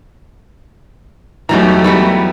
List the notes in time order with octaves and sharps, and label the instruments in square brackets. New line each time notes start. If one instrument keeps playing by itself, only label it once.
[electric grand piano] E2 F#3 A#5 [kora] E3 G3 D#4 [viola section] A3 G4
[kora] E3 G3 B3